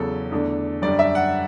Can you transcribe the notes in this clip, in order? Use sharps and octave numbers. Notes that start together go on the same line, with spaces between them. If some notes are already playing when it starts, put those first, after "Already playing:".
Already playing: E2 C#3 F#3 A4
E2 D3 A3 D4
F#2 D3 G3 D4 D5
E5
F#5